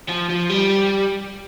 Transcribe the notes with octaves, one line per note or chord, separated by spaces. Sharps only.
F3
F3
G3